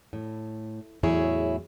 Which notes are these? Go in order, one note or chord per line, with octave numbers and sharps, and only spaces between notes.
A2
E2 A2 F#3 E4 G#4 C#5